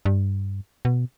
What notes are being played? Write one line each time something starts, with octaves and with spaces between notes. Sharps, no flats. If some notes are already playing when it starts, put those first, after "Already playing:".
G2
B2